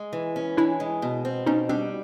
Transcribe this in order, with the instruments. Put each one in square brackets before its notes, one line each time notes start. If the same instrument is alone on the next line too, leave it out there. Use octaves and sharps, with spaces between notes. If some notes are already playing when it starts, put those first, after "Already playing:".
Already playing: [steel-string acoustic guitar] G#3
E3
C#4
[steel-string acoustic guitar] E3 [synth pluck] D4 E4
[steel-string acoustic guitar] G#3
B2
C4
[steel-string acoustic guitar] B2 [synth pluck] C#4 D#4
[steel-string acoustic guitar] G3 [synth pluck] C4 D4